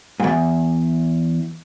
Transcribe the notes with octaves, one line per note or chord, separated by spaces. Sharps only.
E2 G#2